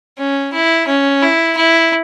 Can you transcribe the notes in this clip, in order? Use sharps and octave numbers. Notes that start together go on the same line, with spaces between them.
C#4
E4
C#4
E4
E4